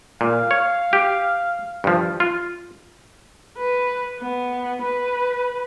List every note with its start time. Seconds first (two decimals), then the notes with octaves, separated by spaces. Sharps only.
0.21 A#2 F5
0.51 C#5
0.93 G4
1.84 G2 F3
2.20 F4
3.58 B4
4.20 B3
4.82 B4